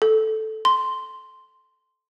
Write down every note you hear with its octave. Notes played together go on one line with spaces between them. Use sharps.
A4
C6